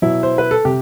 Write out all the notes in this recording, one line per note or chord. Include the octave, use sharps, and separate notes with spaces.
B2 F#3 E4
C5
B4
A4
C3 G4